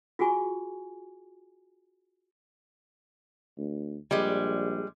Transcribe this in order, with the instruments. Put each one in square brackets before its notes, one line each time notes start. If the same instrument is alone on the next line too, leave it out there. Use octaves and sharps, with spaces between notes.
[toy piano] F4 F#4 G#4 G#5 C#6
[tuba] D2
[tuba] A#1 [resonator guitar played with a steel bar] G3 G#3